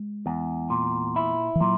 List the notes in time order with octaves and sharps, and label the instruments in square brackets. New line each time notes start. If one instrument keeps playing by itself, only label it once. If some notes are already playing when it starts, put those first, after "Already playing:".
Already playing: [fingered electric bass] G#3
[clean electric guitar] E2
A#2
E4
[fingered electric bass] E3
[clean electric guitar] A#2 [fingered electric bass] F#3